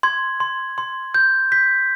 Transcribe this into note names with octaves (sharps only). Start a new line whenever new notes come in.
C6 G#6
C6
C6
G6
G6 B6